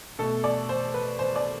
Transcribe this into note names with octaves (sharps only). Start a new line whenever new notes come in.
B2 A3 A4
D5
C5
B4
C5
D5